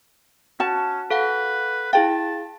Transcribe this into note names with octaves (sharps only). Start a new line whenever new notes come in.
C#4 F#4 A5
A4 B4 F5 F#5
E4 G#4 F5 G5 A5